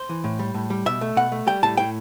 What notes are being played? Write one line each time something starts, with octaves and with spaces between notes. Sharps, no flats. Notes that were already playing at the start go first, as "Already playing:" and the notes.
Already playing: C5
E3
A2
G3
A2
G3
B2 E5
A3
B2 F#5
A3
G3 G5
A2 A5
A2 G5